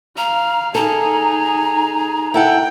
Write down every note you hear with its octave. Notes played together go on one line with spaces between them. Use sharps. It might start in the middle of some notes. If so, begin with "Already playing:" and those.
F5 A#5
D#4 G#4 A4 A#5
E4 A4 F#5 G5